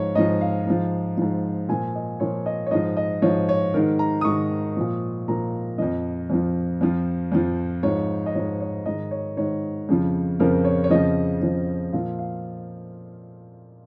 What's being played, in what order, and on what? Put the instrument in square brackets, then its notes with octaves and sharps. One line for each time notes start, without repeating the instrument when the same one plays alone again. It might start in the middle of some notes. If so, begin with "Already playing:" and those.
Already playing: [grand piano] G#2 F3 C#5
G#2 F3 D#5
F5
G#2 F3
G#2 F3
A#2 F3 G#5
D#5
A#2 F3 C#5
D#5
C#5
G#2 F3 D#5
D#5
G#2 F3 C#5
C#5
G#2 D#3 A#4
A#5
D#6
G#2 D#3 C#6
A#2 F3
A#2 F3 A#5
F2 F3 D#5
F2 F3
F2 F3
F2 F3
G#2 F3 C#5
D#5
G#2 F3 C#5
C#5
G#2 D#3 D#5
C#5
G#2 D#3 C#5
F2 C#3 F3
F2 C#3 F3 A#4
C#5
C#5
F2 C#3 F3 D#5
F2 C#3 F3
A#2 F3 F5
F5